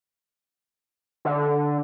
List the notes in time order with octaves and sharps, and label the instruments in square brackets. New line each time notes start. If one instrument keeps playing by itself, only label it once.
[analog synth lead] D3